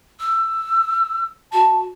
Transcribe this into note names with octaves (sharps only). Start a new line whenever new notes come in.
E6
F#4 A5